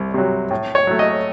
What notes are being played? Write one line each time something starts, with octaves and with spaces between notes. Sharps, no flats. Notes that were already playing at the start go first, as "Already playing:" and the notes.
Already playing: C2
C3 F#3
A2
C#5
F#3 A3
D#5